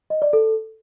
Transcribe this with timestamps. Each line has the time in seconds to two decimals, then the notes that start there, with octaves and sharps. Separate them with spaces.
0.10 D#5
0.22 D5
0.33 A4